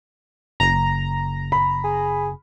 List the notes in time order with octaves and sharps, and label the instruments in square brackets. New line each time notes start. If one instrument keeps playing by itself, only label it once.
[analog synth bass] F#1 [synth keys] A#5
[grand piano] B5
[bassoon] G#4